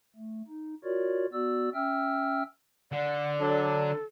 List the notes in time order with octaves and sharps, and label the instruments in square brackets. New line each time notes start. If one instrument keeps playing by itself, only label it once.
[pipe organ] A3
D#4
F4 F#4 A#4 C#5 D5
B3 F#4 D5 E6
C#4 E5 G5 E6 F6
[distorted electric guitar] D3 [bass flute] D5 [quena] F#5
[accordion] F#3 D4 [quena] A4